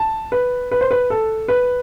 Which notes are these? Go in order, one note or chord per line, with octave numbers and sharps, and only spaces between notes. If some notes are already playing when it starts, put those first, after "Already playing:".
Already playing: A5
B4
B4
C5
B4
A4
B4